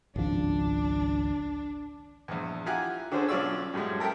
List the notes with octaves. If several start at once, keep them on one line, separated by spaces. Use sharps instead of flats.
G#1 C#2 F3 D4
A#1 E2
E4 F4 G4 F#5 G#5 A#5
D3 C#4 D4 G#4 C5
B1 C#4 F4 D5 C#6 E6
F#2 A2 G3 G#3
A4 A#4 E5 G5 A5